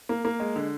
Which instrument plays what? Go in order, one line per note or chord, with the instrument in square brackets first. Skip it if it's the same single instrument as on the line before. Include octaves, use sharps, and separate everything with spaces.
[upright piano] A#3
A#3
G#3
D3